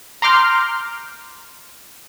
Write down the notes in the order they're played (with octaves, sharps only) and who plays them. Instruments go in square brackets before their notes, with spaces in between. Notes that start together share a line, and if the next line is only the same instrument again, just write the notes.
[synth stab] A#5 C6 D6 F6 G6